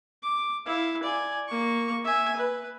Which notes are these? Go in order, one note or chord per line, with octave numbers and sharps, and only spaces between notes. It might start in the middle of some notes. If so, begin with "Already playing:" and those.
D6
E4 F5
D5 G#5
A#3 C#6
E5 G#5
B4